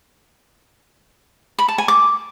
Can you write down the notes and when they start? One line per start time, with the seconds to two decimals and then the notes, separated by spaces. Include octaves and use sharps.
1.59 B5
1.68 A5
1.78 G#5
1.88 D6